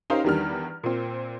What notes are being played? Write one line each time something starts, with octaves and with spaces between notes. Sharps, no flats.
C#4 D#4 G4 A#4 C5 F5
E2 D#3 G3 D4 F6
A#2 C4